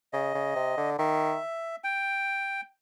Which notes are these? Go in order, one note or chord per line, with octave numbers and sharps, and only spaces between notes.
C#3 D#5
C#3
C3
D3
D#3 E5
G5